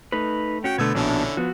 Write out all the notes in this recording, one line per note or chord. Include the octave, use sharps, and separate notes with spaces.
A3 D#4 B4
C#4 F#4 G5
B2 D3 A3 B3 E6 G#6
A#1 B2 D3 C#4 D4 E4
F3 B3 F#4